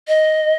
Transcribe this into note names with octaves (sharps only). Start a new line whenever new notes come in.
D#5